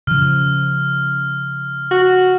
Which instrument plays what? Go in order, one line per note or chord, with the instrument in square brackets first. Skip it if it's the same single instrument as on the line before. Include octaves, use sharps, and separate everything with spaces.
[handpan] C#3 F3 [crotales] F6
[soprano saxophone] F#4